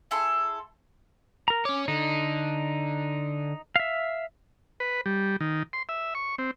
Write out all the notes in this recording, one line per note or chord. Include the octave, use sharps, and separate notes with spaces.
E4 G#4 A4 C6
A#4 A#5
C#4 C#5 D6
D3 D#4
E5 F5
B4
G3
D#3
C6
E5
C#6
C4